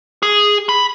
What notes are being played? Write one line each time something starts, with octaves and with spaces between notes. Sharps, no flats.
G#4
B5